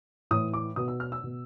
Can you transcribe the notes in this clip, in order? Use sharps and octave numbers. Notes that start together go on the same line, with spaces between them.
A2 E3 D#6
D6
B2 D#6
E6
F6
E6
B2